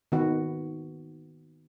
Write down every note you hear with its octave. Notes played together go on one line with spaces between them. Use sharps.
D#3 B3 F#4